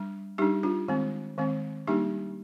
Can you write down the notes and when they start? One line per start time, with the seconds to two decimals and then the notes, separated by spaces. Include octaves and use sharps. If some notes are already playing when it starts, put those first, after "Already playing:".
Already playing: G3 D4
0.38 G3 D4 D#4 G4
0.63 D4 F4
0.88 D#3 G#3 C4
1.38 D#3 G#3 C4
1.87 G3 A#3 D4 D#4 G4